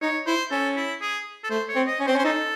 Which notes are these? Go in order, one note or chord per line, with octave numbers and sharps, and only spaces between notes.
D#4 C#5
E4 C5
C#4 A4
E4
G#4
A4
A3 C5
C#5
C4
D#5
C#4
C4 C5
C#4
C5
D#4 A4